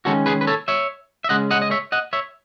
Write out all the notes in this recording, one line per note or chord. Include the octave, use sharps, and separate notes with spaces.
D#3 G#3 C#4 F#4 A4
G#4 B4
B4
A4 C#5
C#5 E5
E5
C#3 G#3 C#4 D#5 F#5
D#5 F#5
D#5
C#5 E5
D#5 F#5
C#5 E5